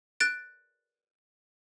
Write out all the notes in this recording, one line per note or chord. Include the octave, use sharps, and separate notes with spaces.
F#6 A6 D7